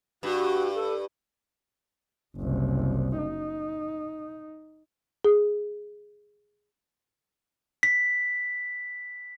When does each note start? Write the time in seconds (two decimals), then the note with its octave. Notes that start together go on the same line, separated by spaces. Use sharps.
0.23 G2 F#4
0.74 A4
2.37 F#1 C2
3.18 D#4
5.25 G#4
7.83 B6